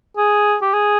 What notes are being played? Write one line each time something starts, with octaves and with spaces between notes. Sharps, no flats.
G#4
G4
G#4